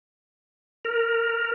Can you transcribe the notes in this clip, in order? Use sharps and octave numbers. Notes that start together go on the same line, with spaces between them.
A#4